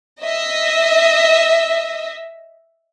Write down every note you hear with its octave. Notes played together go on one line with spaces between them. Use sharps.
D#5 E5